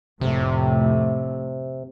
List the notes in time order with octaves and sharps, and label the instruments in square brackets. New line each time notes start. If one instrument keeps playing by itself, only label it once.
[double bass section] F1 A2 A3 [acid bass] C3